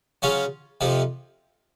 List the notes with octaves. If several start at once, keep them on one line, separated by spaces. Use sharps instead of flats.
C#3 F#3 C#4 F4
F2 C3 F3